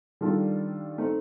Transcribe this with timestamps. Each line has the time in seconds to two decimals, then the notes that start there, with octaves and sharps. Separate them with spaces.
0.21 D#3 G3 D4 F4 A4
0.98 A3 C4 D#4